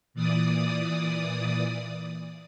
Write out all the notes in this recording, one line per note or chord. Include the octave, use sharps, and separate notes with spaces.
A#2 E3 D5 D#6